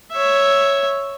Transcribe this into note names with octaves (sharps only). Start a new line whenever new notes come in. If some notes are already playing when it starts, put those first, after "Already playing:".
C#5 E5